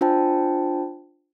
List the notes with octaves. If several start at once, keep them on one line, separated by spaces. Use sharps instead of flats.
D4 F4 C5 G5 A5